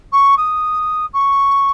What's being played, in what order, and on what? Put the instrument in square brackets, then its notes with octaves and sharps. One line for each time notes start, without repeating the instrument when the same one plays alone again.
[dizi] C#6
D#6
C#6